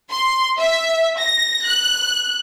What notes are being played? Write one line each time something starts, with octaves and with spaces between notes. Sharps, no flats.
C6
E5
A#6
F#6